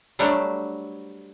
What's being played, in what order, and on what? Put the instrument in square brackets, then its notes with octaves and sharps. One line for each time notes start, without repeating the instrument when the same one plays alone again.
[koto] F#3 G3 A3 D4 C5